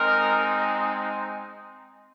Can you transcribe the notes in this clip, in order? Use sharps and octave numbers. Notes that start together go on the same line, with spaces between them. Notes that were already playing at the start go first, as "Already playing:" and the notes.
Already playing: G#3 C4 D#4 A#4